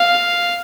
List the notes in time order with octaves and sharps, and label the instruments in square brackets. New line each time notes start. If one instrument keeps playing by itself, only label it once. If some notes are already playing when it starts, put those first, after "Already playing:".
Already playing: [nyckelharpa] F5